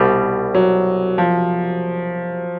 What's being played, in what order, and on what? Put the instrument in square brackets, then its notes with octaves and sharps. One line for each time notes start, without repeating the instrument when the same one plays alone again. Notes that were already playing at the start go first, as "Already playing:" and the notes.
Already playing: [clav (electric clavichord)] C2 B2 G3
[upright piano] F#3
F3